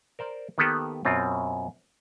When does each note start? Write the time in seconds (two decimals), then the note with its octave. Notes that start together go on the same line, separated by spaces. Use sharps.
0.19 A#4 C5 D5
0.58 D#3 A#3 B3 G4 A4 B4
1.05 F#2 B2 C4 F4